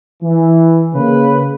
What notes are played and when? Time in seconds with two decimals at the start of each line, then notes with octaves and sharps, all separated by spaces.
0.22 E3
0.93 C#3 A#3 B4